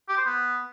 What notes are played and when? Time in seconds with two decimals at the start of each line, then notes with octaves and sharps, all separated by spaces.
0.09 G4
0.17 C5
0.25 B3